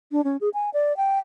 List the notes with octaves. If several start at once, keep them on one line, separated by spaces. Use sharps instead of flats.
D4
C#4
G#4
G#5
D5
G5